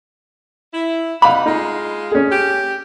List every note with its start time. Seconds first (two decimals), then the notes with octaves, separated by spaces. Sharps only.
0.74 E4
1.22 C3 D#4 F5 F#5 B5
1.46 G#3 D#4 F4
2.11 C#4 G#4
2.31 G4